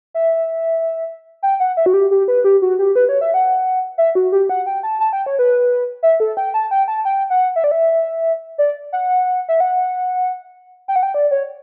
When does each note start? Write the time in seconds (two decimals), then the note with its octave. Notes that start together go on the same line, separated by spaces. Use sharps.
0.14 E5
1.43 G5
1.60 F#5
1.77 E5
1.86 F#4
1.94 G4
2.11 G4
2.28 B4
2.44 G4
2.62 F#4
2.79 G4
2.96 B4
3.09 C#5
3.21 E5
3.34 F#5
3.98 E5
4.15 F#4
4.32 G4
4.49 F#5
4.67 G5
4.83 A5
5.00 A5
5.13 G5
5.26 C#5
5.39 B4
6.03 E5
6.20 A4
6.37 G5
6.54 A5
6.71 G5
6.88 A5
7.05 G5
7.30 F#5
7.56 E5
7.64 D5
7.71 E5
8.58 D5
8.93 F#5
9.49 E5
9.60 F#5
10.88 G5
10.96 F#5
11.03 G5
11.14 D5
11.31 C#5